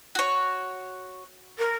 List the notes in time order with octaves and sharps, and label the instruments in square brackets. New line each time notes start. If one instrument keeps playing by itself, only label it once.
[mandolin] F#4 C#5
[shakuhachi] A#4